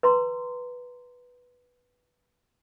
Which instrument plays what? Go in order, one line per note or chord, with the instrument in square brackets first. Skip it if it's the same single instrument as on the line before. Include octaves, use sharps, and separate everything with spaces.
[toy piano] B4 A#5 C6